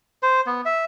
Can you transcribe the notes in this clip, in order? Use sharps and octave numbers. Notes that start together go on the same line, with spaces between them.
C5
B3
E5